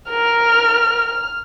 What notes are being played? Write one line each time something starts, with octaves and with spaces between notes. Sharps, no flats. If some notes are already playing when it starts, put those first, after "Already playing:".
A#4 F6